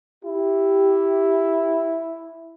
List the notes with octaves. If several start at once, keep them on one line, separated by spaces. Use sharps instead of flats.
E4 G4